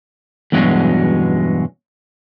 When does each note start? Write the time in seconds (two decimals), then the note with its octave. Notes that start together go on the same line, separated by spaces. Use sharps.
0.52 E2 G2 B2 F#3 G#3 C#4